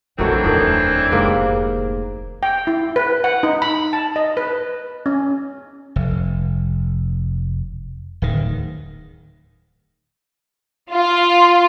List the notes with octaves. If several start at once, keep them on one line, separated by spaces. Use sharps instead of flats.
F1 A#1 D#3 E3 F#3 A3 C4 D4
D#1 F2 A2 D#3
F1 G#2 A#3 G4
G5
E4
B4
F#5
D#4
B5
A5
D#5
B4
C#4
F1
D1 D#3
F4